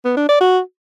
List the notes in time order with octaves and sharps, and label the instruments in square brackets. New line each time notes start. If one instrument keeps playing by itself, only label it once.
[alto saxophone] B3
D4
D5
F#4